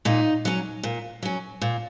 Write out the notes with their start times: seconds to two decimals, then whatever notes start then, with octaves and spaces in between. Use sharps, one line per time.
0.05 A#2 D#4
0.45 F#3 C#4
0.83 A#2
1.22 F#3 C#4
1.61 A#2